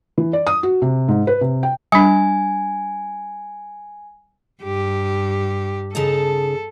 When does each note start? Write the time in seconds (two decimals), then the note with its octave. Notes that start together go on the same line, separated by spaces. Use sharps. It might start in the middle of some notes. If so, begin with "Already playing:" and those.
0.18 E3
0.33 D5
0.47 D#6
0.63 F#4
0.82 C3
1.08 G#2
1.27 B4
1.41 C3
1.63 G5
1.92 G3 D4 G#5
4.63 G2 G4
5.95 C#3 D#4 A4 A5